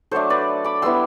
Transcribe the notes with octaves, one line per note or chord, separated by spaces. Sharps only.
F#3 A3 D4 A4 C5
B4 D5
B5 D6
G3 B3 E4 C6 E6